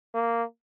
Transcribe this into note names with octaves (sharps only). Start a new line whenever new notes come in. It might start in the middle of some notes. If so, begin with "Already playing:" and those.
A#3